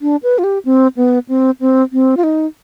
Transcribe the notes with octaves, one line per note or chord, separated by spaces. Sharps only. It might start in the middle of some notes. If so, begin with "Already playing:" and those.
D4
B4
F4
G4
C4
B3
C4
C4
C4
F4
D#4